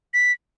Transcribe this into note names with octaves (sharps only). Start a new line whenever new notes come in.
B6